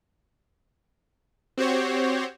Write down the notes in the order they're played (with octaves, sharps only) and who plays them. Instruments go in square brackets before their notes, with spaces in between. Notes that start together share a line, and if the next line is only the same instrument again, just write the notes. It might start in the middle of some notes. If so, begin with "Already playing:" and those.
[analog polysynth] C4 F#4 G4 C5 C#5